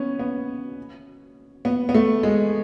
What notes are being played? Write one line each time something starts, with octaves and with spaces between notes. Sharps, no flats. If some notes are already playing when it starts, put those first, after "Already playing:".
Already playing: B3 C#4
B3
B3
B3
A3
G#3